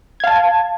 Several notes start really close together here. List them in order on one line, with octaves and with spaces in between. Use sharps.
G#6 F5 A5